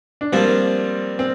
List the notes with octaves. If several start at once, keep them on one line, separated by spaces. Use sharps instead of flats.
D4
F3 G3 A#3 C4 D4 F4
C4